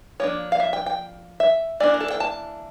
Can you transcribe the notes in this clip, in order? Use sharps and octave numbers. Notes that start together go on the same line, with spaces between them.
F3 A#3 D4 C#5
F5
E5
G5
G5
E5
E3 A#3 D4 D5
A#4
A4
G5
A5